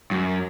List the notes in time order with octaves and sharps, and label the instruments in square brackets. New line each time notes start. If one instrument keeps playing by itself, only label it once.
[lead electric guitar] F#2